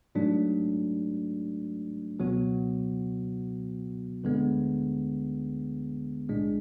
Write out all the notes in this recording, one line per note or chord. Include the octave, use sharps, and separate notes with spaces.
A1 G#2 F#3 A3 D4
C#2 B2 F#3 B3 F#4
D2 D3 G#3 B3
B1 A2 G#3 D4